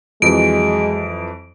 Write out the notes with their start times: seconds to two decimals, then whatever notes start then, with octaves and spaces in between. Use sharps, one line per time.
0.22 F2 E3 F#3 G#3 D7